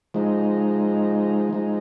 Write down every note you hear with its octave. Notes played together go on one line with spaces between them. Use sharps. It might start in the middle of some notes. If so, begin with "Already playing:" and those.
F3 G#3 D#4
F3 G#3 D#4